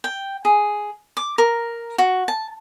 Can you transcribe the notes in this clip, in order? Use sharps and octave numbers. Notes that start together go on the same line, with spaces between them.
G5
G#4
D6
A#4
F#4
A5